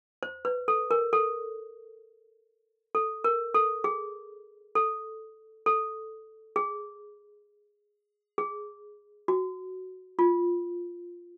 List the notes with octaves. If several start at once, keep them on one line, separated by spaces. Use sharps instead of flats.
C5
B4
A4
A#4
A4
A4
A#4
A4
G#4
A4
A4
G#4
G#4
F#4
F4